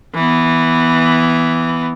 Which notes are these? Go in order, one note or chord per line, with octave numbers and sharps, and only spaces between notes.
E3 B3